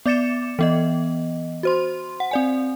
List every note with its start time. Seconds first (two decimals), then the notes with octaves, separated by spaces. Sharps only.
0.06 B3 D5 D6 A6 C#7 E7
0.59 E3 B3 D#5
1.63 F#4 C5 C6
2.20 F#5
2.31 C4 D5 G#5